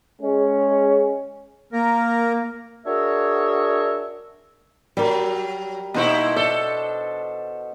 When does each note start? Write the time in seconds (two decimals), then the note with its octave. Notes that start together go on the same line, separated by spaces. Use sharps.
0.22 G#3 C#4
1.73 A#3 A#4
2.86 D4 F#4 G#4 A#4 C#5 E5
4.97 F#3 G3 A#4
5.94 B2 A#3 D#4 E4 C5 C#6
6.36 D4 A4